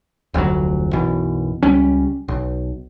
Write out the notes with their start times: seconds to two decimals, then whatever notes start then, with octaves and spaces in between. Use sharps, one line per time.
0.34 F1 D2 B2 F#3
0.93 B1 F#2 B2 E3
1.63 C#2 G3 C#4
2.28 B1